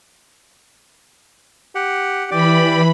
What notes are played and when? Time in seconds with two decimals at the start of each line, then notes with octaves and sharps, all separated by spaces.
1.75 G4 F#5
2.31 E3 G4 D5 B5